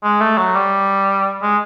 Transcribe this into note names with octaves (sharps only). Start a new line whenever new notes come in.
G#3
A3
F#3
G3
G#3